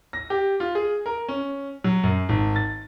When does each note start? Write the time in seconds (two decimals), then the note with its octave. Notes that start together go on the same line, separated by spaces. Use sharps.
0.13 A#6
0.30 G4
0.60 F4
0.75 G#4
1.06 A#4
1.29 C#4
1.84 F#3
2.03 F#2
2.29 G#1
2.56 A6